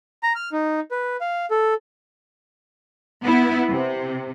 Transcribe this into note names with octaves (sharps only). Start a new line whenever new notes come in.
A#5
F6
D#4
B4
F5
A4
B3 E4
C3